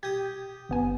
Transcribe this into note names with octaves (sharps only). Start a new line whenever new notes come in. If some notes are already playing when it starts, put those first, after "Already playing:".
G4 D#6 G#6
G1 B3 G#5